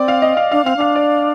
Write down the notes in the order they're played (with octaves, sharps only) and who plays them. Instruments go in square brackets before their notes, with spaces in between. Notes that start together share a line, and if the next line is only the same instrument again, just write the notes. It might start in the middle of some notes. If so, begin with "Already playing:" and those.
Already playing: [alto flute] C4 [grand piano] D5
[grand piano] F5
D#5
F5
[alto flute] D4 [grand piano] F5
[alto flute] C4 [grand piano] F5
[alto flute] D4 [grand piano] F5
[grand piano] D5